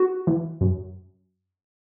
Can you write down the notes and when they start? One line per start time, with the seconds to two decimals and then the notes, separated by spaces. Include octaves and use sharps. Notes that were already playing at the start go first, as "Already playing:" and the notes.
Already playing: F#4
0.27 E3
0.61 F#2